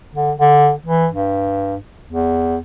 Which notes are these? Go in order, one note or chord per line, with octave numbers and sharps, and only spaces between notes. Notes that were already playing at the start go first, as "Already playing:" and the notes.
D3
D3
E3
G2
E2